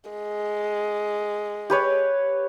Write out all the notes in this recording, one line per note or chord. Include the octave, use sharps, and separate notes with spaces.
G#3
G4 B4 C#5